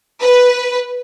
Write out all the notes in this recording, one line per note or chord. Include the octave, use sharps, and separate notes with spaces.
B4